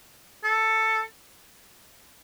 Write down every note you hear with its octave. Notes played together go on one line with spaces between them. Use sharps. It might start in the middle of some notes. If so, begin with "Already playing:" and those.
A4